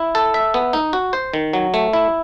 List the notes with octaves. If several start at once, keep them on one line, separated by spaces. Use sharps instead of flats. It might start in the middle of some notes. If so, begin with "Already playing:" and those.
Already playing: E4
A4
E5
B3
D#4
F#4
C5
D#3
F#3
A3
E4